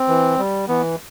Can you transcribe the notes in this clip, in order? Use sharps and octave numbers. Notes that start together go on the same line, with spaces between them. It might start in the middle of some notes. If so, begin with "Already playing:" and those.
Already playing: C4
E3
G3
E3 B3